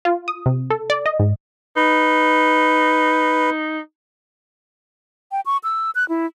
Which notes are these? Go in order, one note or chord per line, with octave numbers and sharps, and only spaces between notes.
F4
D#6
C3
A4
D5
D#5
G#2
D#4 B4
G5
C#6
E6
F#6
E4